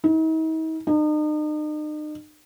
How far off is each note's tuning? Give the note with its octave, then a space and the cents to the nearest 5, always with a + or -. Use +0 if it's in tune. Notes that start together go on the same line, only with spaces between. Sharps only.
D#4 +45
D#4 -40